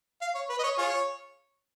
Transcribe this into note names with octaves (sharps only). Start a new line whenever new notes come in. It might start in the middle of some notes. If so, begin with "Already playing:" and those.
F5
C#5
B4
D#5
C#5
F4 G#4 C#5